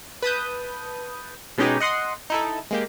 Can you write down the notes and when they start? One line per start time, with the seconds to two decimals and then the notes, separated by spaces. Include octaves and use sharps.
0.22 B4 A5 D#6 G6
1.58 B2 G#3 C#4 D#4 G4 G#4
1.80 D#5 F#5 C6 D#6
2.30 D#4 E4 A4
2.71 G#3 A#3 G4